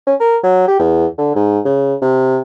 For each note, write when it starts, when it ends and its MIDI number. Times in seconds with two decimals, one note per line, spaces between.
0.07 0.15 61
0.20 0.37 70
0.44 0.64 54
0.68 0.77 67
0.80 1.06 40
1.18 1.32 50
1.36 1.60 44
1.65 1.95 49
2.02 2.40 48